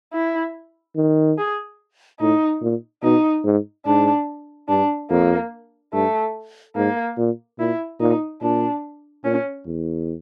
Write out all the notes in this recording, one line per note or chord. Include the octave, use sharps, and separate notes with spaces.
E4
D#3
G#4
A2 D#4
A#2
B2 D#4
G#2
G#2 D4
G2 D4
F2 A#3
G2 A3
G#2 A#3
A#2
A#2 E4
A#2 D#4
A#2 D4
A#2 C#4
E2